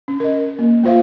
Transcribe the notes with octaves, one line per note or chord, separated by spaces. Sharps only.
C#4
A#4 D#5
A#3
A3 F4 C5 E5 F5